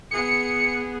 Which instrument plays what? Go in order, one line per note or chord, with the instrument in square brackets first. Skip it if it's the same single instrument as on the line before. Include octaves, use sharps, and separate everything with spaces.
[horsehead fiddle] B3 G#4 [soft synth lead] C#7